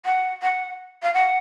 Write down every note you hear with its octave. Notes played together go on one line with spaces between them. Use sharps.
F#5
F#5
F5
F#5